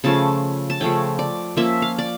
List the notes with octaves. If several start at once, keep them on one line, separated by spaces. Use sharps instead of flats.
C#3 F3 A3 C#4 A5
A5
C#3 F3 A3 C#4 G5
D5
F3 A#3 C#4 E5
F5
D5